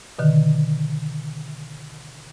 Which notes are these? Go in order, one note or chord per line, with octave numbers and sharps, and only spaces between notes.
B2 D3 D#3